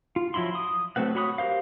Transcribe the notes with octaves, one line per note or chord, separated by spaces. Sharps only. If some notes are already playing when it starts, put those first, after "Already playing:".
F4
F3 F#3 E4 B5 C6
D#6
F#3 A3 C4 B4 F#5
F#4 C#5 B5 C6 D#6
G4 A#4 C5 F5